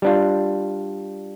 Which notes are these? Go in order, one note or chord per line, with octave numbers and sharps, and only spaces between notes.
G3 D4 F4